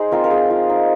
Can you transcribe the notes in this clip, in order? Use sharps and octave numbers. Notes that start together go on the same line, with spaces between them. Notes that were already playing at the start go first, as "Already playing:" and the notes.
Already playing: D#4 G#4 C5 D#5
C4 F4 A#4
A#4
C4 G#4 C5
F3
D#4